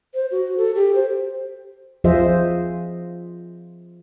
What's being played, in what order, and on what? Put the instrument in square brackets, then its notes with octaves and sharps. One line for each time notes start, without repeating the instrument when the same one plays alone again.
[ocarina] C5
F#4
A4
G4
C5
[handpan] F3 F4 G#4 C5 D#5 E5